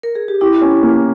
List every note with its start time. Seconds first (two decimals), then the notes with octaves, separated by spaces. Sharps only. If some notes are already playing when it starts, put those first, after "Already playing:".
0.03 A#4
0.15 G#4
0.28 G4
0.41 E4 G4
0.62 C#4
0.83 A#3